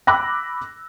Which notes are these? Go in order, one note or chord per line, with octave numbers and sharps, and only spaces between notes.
B5 D6 E6 F#6 A#6